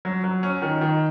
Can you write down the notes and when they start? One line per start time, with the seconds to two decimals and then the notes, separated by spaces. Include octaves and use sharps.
0.05 F#3
0.24 F#3
0.43 C#4
0.62 D#3
0.81 D#3